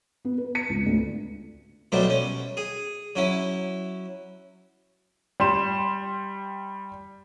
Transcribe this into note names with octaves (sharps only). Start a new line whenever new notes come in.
B3
B4
C#7
C#2
D2
B2 F#3 G3 A3 C5
C#4
G#4
F#3 C#4 E4
G3 C6 E7